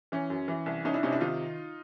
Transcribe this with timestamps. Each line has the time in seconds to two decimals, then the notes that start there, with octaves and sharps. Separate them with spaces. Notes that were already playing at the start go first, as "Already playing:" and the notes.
0.12 E3 C#4
0.30 F#2
0.48 E3
0.66 C2
0.85 C2 C#4 D#4
0.94 D4 E4
1.03 C3 C#4 D#4
1.12 D4 E4
1.21 D#3 D#4 F4